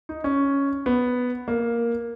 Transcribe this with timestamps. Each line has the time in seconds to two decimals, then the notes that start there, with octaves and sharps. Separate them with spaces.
0.09 D#4
0.24 C#4
0.86 B3
1.48 A#3